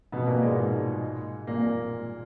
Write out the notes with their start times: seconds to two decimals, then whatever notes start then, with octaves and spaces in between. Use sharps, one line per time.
0.12 B2 B3
0.27 A#2 A#3
0.42 G#2 G#3
1.47 A#2 A#3